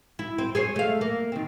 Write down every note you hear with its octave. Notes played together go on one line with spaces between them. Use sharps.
E4
C4
G#4 C5 C#5
A3 F5
A#3
D#3 C4